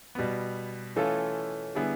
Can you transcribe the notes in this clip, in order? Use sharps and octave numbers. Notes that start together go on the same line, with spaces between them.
B2 G3 B3
E3 A3 C#4 F4 A4
D3 G3 B3 E4 G#4